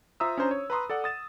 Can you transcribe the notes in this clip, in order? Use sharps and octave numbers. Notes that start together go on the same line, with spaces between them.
F4 C5 E5 A#5 D#6 E6
C#4 D4 C5 A#5
C#5
B4 A#5 C6 D#6
A4 D5 F#5
D#6 A6 E7